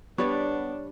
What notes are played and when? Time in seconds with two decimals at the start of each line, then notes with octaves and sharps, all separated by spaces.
0.18 G3 B3 D4 B4 C#5 D5